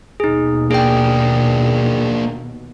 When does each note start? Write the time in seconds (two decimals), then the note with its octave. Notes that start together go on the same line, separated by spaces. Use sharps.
0.20 D#2 B2 D#4 G#4
0.71 A#3 D4 G#4 G5